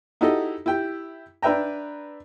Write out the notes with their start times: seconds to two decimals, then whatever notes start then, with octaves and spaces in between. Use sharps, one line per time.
0.21 D#4 E4 F#4 G4 A4 D#5
0.66 E4 G4 G5
1.42 D4 B4 E5 G5 A#5